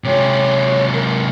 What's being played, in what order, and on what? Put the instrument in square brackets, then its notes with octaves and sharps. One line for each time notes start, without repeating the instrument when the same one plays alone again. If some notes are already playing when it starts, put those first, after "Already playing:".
[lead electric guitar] C3 G#3 [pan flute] C#5
[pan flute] A#4